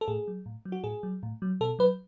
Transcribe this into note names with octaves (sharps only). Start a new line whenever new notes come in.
A4
A2 G#4
F#3
A2
F#3
F#4
A2 G#4
F#3
A2
F#3
B2 A4
F#3 B4